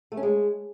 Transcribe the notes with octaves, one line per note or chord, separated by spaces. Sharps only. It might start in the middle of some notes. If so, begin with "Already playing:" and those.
A3
C#4
G#3